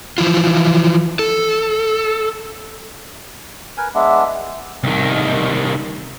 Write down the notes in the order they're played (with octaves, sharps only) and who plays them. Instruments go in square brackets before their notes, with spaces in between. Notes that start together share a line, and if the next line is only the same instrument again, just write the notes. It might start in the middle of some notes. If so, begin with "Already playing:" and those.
[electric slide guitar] E3 F3 E4 F4
A4
[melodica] A#4 B4 G#5
[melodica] G#3 B3 D4 [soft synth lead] E5
[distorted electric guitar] C2 D#3